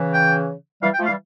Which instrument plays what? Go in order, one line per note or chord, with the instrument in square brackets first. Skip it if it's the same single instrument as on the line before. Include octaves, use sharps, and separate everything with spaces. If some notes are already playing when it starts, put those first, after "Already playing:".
Already playing: [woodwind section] C#3 E3
[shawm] G5
[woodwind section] E3 G3 [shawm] F5
[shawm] G5
[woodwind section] F3 A3
[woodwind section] E3 G3 [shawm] F5